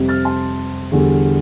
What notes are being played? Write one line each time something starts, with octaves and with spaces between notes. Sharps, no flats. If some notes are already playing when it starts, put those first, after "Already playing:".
Already playing: F2 C3 G3
F6 A6
A5 C6
E2 D3 G3